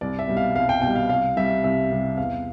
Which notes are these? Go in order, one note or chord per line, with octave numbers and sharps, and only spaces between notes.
C2 D5
E5
B2 G3
F5
C2 F5
G5
B2 G3 G5
F5
C2 F5
C3 G3 E5
C2 E5
C3 G3
E2 F5